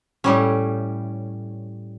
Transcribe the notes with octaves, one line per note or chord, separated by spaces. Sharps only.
A2 G3 C#4